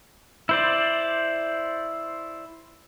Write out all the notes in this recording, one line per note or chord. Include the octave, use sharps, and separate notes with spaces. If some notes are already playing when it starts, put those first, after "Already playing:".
E4 C5 D5